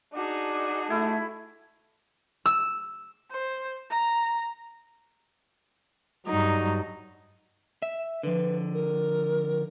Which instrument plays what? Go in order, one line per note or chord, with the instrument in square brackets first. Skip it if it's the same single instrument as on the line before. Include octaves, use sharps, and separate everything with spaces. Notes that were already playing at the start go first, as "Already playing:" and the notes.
[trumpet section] D4 [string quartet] D#4 F#4 G#4
[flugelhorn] A3 [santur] E4
[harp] E6
[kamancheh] C5
A#5
[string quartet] G2 F#3 [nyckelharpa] D#4
[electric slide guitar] E5
[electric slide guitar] D3 F3 [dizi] B4
[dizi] A#4